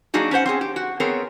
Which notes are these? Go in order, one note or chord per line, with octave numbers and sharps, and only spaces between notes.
F#3 A#3 D4 D#4 F#4 G#4
C#4 D4 C5 F#5
C4 C#4 G#4
G4
F#4
B3 C4 G#4 A#4 C#5